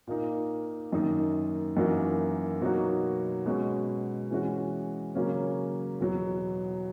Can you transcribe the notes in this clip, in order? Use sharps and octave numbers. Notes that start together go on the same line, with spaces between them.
A#2 A#3 D#4
F#2 D#3 A#3 D#4
F#2 E3 A#3 D#4 F#4
B2 F#3 A#3 D#4 F#4
B2 G#3 C#4 F#4
E3 G#3 C#4 F#4
C#3 F#3 A#3 C#4
E2 B2 F#3